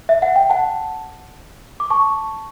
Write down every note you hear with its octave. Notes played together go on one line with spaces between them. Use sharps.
E5
F#5
G5
F#5 A5
D6
A5 C#6